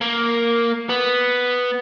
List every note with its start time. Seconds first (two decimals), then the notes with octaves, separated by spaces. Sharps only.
0.01 A#3
0.89 B3